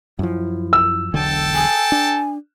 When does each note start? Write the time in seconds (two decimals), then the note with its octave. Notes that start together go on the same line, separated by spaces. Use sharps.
0.19 F#2 F3 E4
0.73 E6
1.14 E1 B1 D3 A4 G5 A5
1.54 G#5
1.92 D4